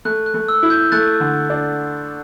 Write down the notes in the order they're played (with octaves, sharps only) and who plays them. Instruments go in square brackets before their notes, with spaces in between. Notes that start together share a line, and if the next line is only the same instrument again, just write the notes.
[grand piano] A3 [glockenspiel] F#6
[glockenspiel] F#6
[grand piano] A3
[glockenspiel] E6
[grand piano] E4
[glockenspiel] G6
[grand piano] A3 [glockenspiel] F#6 A6
[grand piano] D3
D4